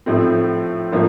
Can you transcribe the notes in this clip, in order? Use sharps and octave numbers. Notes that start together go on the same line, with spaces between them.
A2 F3 A3 C4
A2 F3 A#3 D4